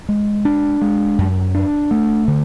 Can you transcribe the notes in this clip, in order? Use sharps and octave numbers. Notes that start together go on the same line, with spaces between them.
G#3
D4
G#3
F#2
D4
A3
D3